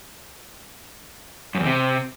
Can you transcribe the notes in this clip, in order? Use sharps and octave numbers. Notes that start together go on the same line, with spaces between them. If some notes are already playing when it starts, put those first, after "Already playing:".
F#2
E2
C3